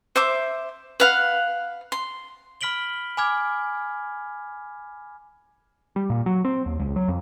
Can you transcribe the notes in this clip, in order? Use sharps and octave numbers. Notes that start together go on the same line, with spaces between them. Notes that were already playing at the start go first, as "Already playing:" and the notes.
C5 E5 D6
B4 F5 F#5
C6
B5 F6 B6 D7 F#7 G7
G#5 B5 D6 F6 G#6
G3
A#2
F#3
C4
D#2
C#2
F#3
F2